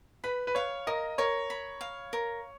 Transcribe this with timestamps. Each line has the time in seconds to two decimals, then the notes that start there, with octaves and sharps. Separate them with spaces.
0.24 B4 B5
0.47 B4
0.55 C#5 F5
0.87 A#4 D#5
1.18 A#4 C#5
1.50 B5
1.81 F5
2.13 A#4